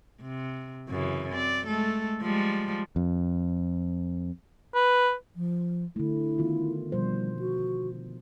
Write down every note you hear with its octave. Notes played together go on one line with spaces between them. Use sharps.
C3
F#2 C#3 E3
C4 D5
G#3 A3 A4
F3 G3 G#3
F2
B4
F3
D3 A3 E4
D#3 B3 F4
B2 F3 G3 C5
F#4